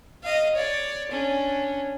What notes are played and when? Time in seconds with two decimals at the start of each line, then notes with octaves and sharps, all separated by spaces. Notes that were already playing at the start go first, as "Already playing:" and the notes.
0.23 D#5 F5
0.55 C#5 D5
1.11 C#4 D4